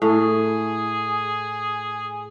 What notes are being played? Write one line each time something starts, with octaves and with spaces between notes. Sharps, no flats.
A2 G#4